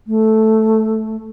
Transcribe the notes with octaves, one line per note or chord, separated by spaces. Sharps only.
A3